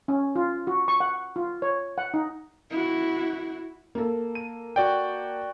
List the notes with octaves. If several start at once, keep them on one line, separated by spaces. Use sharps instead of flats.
C#4
F4
F#4
C#6
F#5
F4
C#5
F#5
D#4
E4 F#4
A#3 A4
D#7
F#4 D5 G5